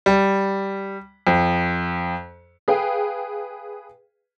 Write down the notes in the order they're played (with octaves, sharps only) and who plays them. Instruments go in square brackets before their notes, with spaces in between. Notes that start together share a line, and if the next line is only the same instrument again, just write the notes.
[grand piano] G3
F2
[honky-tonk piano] G#4 B4 F5 G5